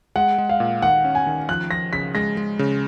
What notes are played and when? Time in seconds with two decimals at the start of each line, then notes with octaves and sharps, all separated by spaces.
0.16 G#3 F#5
0.38 G#3
0.49 F5
0.60 A#2
0.82 D#3 F#5
1.05 C#4
1.15 G#5
1.27 D#3
1.49 F3 F#6
1.71 F3 A#6
1.93 C#3 B6
2.15 G#3 A#6
2.37 G#3
2.59 C#3